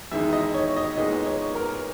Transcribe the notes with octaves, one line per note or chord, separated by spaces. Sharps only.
E2 D#3 G#3 D#4 E5
D#5
C#5
D#5
A#2 G#3 B3 D#4 D#5
C#5
A#4